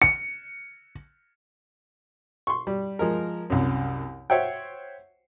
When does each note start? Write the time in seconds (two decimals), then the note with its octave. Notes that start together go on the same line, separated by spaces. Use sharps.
0.02 C#7
2.47 C6 C#6
2.67 G3
2.99 F3 G#3 A#4
3.50 C2 F#2
4.30 C5 C#5 E5 F#5 G5